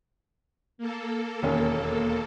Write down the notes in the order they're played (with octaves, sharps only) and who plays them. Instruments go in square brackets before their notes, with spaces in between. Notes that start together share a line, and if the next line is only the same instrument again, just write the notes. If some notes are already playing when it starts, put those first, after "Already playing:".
[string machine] A#3 A4
[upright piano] E1 D#2 C#4